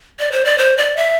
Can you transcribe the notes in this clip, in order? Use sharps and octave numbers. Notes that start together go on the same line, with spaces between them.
D5
C5
D5
C5
D5
E5